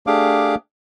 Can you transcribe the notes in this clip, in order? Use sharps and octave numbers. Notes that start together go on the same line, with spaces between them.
A3 D4 G4 G#4 F5 D6